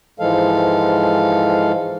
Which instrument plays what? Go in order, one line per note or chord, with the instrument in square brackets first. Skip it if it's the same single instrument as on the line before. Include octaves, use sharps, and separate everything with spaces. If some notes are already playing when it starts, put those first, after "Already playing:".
[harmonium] G#2 E3 F3 G#3 A4 F5